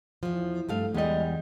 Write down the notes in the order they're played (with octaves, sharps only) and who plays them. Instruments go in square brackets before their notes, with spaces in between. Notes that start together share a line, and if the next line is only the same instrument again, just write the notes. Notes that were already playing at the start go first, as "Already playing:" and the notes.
[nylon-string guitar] E2 F3
G2 A3 F5
[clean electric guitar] E2 G3 [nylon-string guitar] G#3 D#5